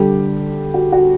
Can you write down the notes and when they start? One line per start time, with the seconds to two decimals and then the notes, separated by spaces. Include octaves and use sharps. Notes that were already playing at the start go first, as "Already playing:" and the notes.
Already playing: D3 G3 G4
0.74 F#4
0.92 F#4